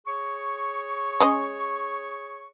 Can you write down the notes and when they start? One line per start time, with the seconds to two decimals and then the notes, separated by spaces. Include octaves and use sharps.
0.06 G#4 C#5 C#6
1.20 G#3 C#4 D#5